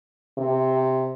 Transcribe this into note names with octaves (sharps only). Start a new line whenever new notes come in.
C3